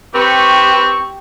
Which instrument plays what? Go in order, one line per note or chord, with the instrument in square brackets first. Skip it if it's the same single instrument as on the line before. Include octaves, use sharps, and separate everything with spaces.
[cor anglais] C4 [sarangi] G4 [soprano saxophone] B4 [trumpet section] C#6